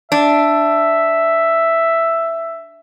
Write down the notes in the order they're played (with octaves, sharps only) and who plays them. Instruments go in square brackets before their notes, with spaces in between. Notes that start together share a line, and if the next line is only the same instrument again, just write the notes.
[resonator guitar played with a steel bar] D4 [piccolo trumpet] E5